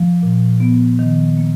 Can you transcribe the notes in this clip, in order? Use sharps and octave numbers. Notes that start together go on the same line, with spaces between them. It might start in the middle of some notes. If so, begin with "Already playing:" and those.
Already playing: F3
A#2
B3
D#3
A#3